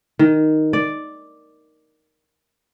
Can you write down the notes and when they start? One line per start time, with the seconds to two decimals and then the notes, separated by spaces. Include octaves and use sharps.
0.19 D#3
0.73 D5